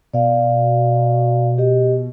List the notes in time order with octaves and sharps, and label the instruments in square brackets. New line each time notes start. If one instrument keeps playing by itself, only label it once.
[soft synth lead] B2 [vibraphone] D5 F5
[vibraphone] G4 D#5